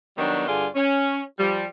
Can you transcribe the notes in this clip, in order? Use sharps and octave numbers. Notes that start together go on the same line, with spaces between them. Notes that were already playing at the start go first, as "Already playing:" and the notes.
D#3 F#3 G3 B3 D4
G2 D3 F4 G#4 D5
C#4
F3 G3